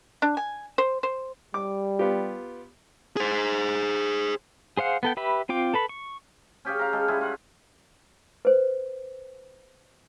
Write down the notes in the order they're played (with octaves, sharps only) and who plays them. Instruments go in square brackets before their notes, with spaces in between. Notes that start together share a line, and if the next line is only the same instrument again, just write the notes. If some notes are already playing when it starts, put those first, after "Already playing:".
[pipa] D4
G#5
C5
C5
[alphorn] G3 [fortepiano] D6
[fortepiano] B3 F4 G4
[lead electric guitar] G#4 C5
[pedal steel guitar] G#4 C5 F5 F#5
B3 A4 G5
G4 B4 E5 B5
C4 F4 G5 D6
A4 B4 B5
C#6
[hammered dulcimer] C#4 G4 G#4 F5
F5 A#5
G#3 G4 A4
G3 E4 F4 G#4
F4 F#5
[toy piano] B4 C5